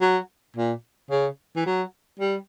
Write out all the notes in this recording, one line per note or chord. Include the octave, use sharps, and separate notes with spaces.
F#3
A#2
C#3
E3
F#3
G3